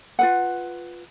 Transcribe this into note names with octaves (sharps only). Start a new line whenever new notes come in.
F4 B4 F#5